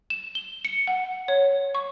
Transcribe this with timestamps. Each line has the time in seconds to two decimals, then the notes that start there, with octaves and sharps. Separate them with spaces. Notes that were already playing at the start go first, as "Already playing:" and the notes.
0.10 E7
0.35 G7
0.65 C#7
0.87 F#5
1.28 C#5
1.75 C#6